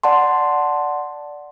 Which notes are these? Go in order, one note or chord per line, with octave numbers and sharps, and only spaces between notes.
D5 F#5 A5 C6